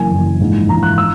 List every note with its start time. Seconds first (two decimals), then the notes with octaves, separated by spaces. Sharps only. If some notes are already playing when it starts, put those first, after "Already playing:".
Already playing: F#1 F#2 E3 G#5
0.11 F#1 F#2 E3
0.40 A#1 G#2 E3
0.68 A#1 G#2 E3 A#5
0.83 F#6
0.98 E6